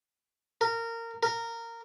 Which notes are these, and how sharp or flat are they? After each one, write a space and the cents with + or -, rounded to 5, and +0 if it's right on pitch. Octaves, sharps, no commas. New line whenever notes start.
A#4 -20
A#4 -15